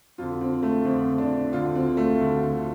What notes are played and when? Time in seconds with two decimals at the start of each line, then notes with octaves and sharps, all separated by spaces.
0.18 F2 D3 F4
0.41 C4
0.63 A3
0.85 F2 D3 C4
1.18 D4
1.52 D2 D3 F4
1.75 C4
1.97 A3
2.20 D2 D3